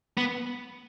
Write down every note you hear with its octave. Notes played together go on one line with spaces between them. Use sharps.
B3